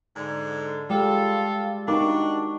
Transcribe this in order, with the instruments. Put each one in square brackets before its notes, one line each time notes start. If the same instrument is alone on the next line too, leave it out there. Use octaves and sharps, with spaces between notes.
[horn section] G#2 D3
[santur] G3 [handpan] G#3 [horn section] F4 A4 [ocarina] F5
[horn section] D4 F#4 [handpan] D#4 A#4 [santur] C#6 D6